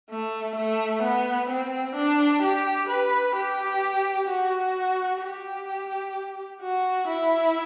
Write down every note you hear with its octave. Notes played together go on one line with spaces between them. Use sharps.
A3
A3
B3
C4
D4
G4
B4
G4
F#4
G4
F#4
E4